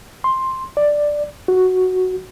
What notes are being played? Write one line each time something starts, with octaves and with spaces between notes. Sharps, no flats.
C6
D5
F#4